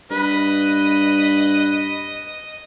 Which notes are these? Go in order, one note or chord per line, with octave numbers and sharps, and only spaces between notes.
G2 B4 D#5